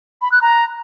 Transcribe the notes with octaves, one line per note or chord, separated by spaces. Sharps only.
B5
F#6
A#5